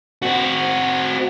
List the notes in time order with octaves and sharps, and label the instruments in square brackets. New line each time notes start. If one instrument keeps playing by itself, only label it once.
[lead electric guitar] C4 F#4